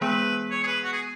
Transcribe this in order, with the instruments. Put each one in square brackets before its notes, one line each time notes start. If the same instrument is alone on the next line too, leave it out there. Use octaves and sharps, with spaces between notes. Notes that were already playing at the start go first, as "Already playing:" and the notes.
[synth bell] E3 G#3 B3 G#4 [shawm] B4
[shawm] C#5
G#4
B4
F#4
G#4